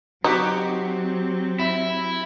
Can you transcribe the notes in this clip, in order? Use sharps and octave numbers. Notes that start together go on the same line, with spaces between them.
F#3 C4 D#4 F#4 G4
E4